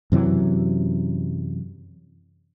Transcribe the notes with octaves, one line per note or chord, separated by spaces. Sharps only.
F#2 C3 E3 F#3